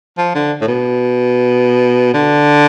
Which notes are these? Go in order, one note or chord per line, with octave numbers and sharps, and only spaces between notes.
F3
D3
A2
B2
D3